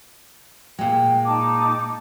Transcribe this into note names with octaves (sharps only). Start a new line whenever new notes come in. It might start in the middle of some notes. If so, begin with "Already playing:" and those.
A#2 G#3 G5
D#4 A5 D6